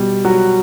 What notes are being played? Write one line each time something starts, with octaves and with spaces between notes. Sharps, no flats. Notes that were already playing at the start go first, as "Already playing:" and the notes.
Already playing: B2 G3
F#3 F#4